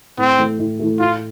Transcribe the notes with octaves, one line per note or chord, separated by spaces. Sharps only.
A2 C4
E3 A3
A2
E3 A3
A2 F4